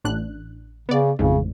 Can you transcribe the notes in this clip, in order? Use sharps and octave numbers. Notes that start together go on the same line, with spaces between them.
A1 D4 F#6
C#3 B3 D5
A1 F2 G#2 C#3